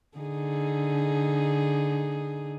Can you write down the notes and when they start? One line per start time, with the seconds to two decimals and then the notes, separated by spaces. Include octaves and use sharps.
0.18 D3 D#4 G#4